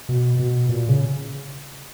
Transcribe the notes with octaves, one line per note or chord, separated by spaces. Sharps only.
B2
B2
A#2
C#3